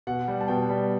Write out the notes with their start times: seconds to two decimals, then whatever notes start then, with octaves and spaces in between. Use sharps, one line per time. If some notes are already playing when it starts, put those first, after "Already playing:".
0.07 B2 F#5
0.28 G3
0.41 A5
0.48 B2 G5
0.69 G3